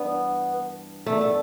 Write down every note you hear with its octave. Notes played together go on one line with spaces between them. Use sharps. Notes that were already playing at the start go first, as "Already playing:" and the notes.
Already playing: G2 E3 G3 B3 D4
E3 A3 B3 D4
A3